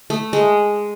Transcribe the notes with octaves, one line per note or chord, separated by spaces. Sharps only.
A3
G#3